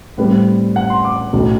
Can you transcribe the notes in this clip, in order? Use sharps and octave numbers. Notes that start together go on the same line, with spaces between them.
A2 G3 C4 B4
F#5
C6
D6
B1 A2 F#3